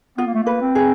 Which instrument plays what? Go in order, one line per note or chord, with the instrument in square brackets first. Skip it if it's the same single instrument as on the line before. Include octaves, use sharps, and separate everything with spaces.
[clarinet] B3 [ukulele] F4
[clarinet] A#3
A3
[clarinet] A#3 [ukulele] B4
[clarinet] C4
[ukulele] G#4